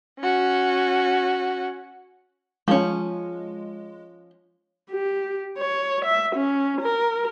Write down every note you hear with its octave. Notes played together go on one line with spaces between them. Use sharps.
C#4 F#4
F3 G#3 C#4
G4
C#5
E5
C#4
A#4